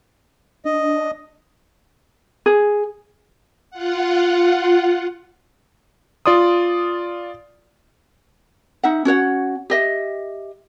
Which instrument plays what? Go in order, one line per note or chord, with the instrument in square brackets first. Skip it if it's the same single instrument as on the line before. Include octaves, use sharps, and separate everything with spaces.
[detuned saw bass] D4 [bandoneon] D#5
[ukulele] G#4
[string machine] F4 F#5
[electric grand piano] F4 D5 C6 D#6
[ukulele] D#4 E5 F#5
C#4 F#4 C#5 F#5
G4 D#5 E5